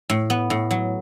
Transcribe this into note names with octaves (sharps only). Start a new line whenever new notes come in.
A2
B3
A2
F#3